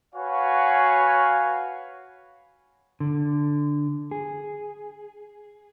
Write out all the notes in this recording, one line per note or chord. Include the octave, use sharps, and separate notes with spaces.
F#4 B4 C#5 F5 G#5
D3
G#4